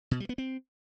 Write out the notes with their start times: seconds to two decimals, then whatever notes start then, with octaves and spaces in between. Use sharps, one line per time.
0.11 B2
0.20 G3
0.29 B3
0.38 C4